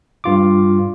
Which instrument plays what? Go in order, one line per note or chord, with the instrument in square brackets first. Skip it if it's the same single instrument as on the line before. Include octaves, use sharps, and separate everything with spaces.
[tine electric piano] G2 F4 D6